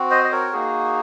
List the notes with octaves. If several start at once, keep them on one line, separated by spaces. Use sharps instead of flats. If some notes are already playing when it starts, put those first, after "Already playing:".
Already playing: C4 F#4
C5 D#5
D#5
A#4 C#5
A#3 D#4 F#4 G#4